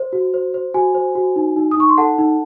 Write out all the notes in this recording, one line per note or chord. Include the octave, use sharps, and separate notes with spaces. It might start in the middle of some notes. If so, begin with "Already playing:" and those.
Already playing: C5
F#4
C5
C5
F#4 G#5
C5
F#4
D#4
D#4
D#6
D#4 C#6
C6
A4 F#5 A5
D#4